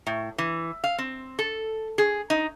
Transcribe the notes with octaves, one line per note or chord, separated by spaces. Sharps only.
A2
E3
F5
C4
A4
G#4
D#4